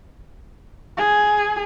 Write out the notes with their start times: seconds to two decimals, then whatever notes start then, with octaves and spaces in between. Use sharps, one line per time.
0.97 G#4